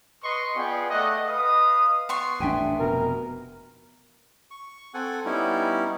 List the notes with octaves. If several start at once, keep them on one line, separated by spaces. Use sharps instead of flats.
B4 D#5 C6 C#6
B3 F4 G#4 D5 G5
A3 D5 D#5 F#5
B4 D#5 F5 D#6
B3 C6 C#6
D#1 A1 D4 E5 G5 G#5
F1 B2 A#4
C#6
C4 A4 F#5 G#5
G3 B3 C#4 D#4 E4